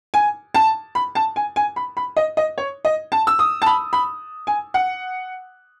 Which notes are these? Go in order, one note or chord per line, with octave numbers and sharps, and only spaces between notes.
G#5
A5
B5
A5
G#5
G#5
B5
B5
D#5
D#5
C#5
D#5
A5
E6
D#6
A5
B5
B5
G#5
F#5